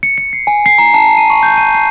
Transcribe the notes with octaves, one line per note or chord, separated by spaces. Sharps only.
C#7
C#7
C7
G#5
C7
A#5
A5
D#7
C#6
G6
D#7
C7